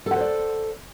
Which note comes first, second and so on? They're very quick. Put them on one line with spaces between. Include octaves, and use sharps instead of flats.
A4 F#5 C5 D5